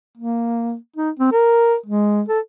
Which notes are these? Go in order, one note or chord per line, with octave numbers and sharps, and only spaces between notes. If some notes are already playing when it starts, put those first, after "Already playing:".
A#3
D#4
C4
A#4
G#3
A4